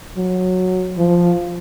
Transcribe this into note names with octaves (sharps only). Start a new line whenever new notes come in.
F#3
F3